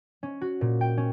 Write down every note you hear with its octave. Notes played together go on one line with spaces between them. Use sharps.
C#4
F#4
A#2
G5
C#4